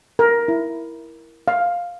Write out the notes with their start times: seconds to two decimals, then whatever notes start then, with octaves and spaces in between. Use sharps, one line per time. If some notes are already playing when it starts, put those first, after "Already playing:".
0.19 A#4
0.48 E4
1.48 F5